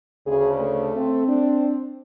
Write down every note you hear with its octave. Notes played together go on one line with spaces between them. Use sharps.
D2 C#3 G#4
A3
C4
D4